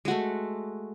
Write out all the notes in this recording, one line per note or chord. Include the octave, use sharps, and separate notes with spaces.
G#3 A3 F#4